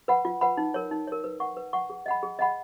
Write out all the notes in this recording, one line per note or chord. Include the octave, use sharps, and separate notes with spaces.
B4 F#5 B5
F4
B4 F#5 B5
D#4
A#4 C#5
D#4
A#4 C#5
B4
F#5 C#6
B4
F#5 C#6
G#4
D#5 F#5 B5
G#4
D#5 F#5 B5